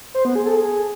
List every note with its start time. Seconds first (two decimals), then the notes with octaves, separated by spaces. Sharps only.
0.14 C5
0.25 B3
0.35 G#4
0.46 A4
0.56 G#4